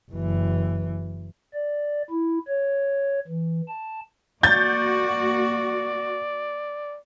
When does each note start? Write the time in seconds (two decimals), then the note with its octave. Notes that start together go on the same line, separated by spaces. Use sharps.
0.12 F#1 E3
1.54 D5
2.10 E4
2.48 C#5
3.28 E3
3.68 A5
4.43 A#3 F#4 D5 G6 A6